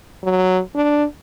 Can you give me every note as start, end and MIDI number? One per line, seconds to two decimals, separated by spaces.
0.24 0.60 54
0.75 1.04 62